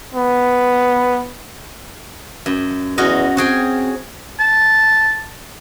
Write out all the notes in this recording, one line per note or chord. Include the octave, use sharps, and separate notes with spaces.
B3
F#2
E2 C#4 F#4 D#5
C4 F#4 G#4 G5
A5